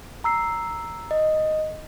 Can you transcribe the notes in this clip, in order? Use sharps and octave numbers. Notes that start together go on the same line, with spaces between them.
A#5 E6 C7
D#5